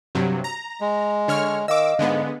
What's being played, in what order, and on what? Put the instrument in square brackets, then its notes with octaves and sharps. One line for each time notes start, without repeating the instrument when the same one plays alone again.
[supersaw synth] G2 C3 F#3
A#5
[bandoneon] G#3
[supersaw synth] D3 C#5 F6
[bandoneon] D#3 [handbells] D#5 F5 [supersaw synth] D6 E6
[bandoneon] G#2 [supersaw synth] D3 G#3 B3